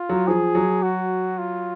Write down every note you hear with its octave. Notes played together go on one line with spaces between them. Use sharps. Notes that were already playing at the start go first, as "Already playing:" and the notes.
Already playing: F4
F#3
F3 G#4
F#3
F#4
F4